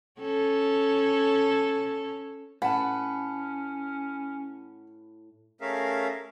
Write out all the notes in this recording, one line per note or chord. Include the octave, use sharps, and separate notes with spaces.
C#4 A4
A2 C#4 B4 F#5 A5
A3 C#4 G#4 A#4 E5 F5